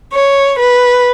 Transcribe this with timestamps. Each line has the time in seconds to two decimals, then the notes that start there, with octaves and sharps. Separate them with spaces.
0.13 C#5
0.58 B4